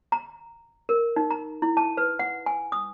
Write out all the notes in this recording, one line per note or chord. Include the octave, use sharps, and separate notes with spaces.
A#5
A#4
D#4
A#5
E4
A5
B4
F#5
G#5
D#6